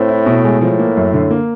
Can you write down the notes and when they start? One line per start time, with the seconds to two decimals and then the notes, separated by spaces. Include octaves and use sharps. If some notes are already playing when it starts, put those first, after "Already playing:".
Already playing: A2 C4
0.09 E4
0.26 B2
0.44 G#3
0.61 A2 F3
0.79 A#3
0.97 F#2
1.14 D3
1.31 A#3